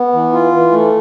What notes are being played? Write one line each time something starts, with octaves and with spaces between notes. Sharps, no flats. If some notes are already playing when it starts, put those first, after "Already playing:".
Already playing: B3
E3
F4
E3
A3